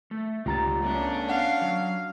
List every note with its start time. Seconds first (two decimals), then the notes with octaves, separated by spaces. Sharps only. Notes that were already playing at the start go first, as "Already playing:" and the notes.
0.11 A3
0.46 C#2 G3 F4 G4 A#5 A6
0.82 A3 B3 C#4 D4
1.29 F5 F#5
1.61 F#3